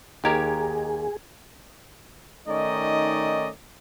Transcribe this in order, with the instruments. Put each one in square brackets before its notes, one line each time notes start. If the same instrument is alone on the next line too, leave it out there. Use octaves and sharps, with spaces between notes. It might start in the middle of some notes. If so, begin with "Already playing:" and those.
[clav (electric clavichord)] D#2 G4 A#4 [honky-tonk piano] D#4 A#5 G#6 [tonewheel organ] G#4
[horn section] D#3 A3 C#4 D#4 D5 D#5